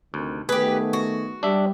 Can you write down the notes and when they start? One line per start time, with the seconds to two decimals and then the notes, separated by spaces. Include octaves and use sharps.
0.14 D2 C3 D#3
0.49 D#3 A3 B3 G4 G#4 B4
0.93 F#4
1.43 G3 D4 G4 E5